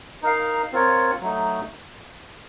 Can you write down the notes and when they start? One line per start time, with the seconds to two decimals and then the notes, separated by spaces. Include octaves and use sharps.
0.23 D#4 A#4 F5
0.72 C4 F4 A#4 C#5
1.21 F#3 A3 D#4